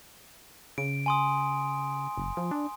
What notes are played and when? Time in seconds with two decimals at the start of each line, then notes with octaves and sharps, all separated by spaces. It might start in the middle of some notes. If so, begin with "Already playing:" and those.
0.78 C#3 D7
1.06 G#5 C6 D#6
2.17 F#1
2.37 F3
2.51 D4